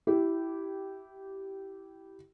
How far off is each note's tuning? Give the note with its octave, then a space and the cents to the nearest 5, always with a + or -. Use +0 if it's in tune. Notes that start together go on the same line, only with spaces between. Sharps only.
E4 +0 G4 -15